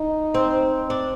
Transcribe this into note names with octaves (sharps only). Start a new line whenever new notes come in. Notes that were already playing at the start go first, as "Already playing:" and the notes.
Already playing: D#4
C4
D4